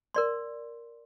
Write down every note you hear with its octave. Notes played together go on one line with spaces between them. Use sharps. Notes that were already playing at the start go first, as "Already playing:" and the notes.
A#4 D5 C6